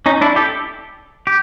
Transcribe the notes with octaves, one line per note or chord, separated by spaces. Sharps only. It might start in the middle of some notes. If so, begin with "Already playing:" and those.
C#4 D#4
D4 E4
G4 A4
G4